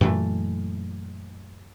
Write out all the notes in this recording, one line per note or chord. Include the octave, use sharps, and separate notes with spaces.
F#2 A#2 E3 A3